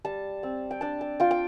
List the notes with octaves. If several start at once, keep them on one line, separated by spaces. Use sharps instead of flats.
G3 A5
C4
G5
D4 A5
A5
F4 G5
G5